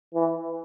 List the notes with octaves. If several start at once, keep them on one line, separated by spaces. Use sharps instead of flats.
E3